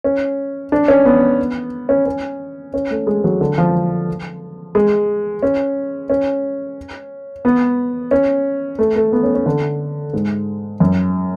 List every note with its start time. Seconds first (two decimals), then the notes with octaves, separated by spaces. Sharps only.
0.04 C#4
0.72 D4
0.88 C#4
1.05 B3
1.89 C#4
2.06 C#4
2.74 C#4
2.91 A3
3.07 G#3
3.24 F#3
3.41 D3
3.58 F3
4.75 G#3
5.43 C#4
6.10 C#4
7.45 B3
8.11 C#4
8.79 A3
8.96 A3
9.13 B3
9.23 C#4
9.35 C#4
9.46 D3
10.13 G#2
10.80 F#2